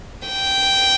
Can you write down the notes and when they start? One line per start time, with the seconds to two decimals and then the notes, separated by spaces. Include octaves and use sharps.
0.27 G5